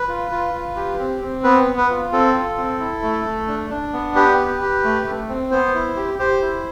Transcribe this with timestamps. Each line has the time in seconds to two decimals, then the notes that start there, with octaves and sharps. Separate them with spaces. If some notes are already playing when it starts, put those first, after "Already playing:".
Already playing: B4
0.08 F4
0.31 F4
0.53 F4
0.76 G4
0.99 C4
1.22 C4
1.44 B3 B4
1.67 B3
1.78 B4
1.90 F4
2.12 C4 A4
2.34 F4
2.57 C4
2.80 E4
3.03 A3
3.25 A3
3.47 D4
3.70 D4
3.93 B3
4.15 G4 B4
4.38 G4
4.61 G4
4.84 A3
5.06 A3
5.29 C4
5.51 B3 C5
5.75 E4
5.96 G4
6.19 G4 C5
6.42 E4